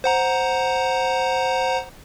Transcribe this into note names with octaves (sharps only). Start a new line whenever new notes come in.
C5 F#5 A#5